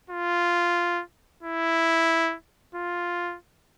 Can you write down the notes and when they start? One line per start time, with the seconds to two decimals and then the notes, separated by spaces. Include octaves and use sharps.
0.10 F4
1.43 E4
2.75 F4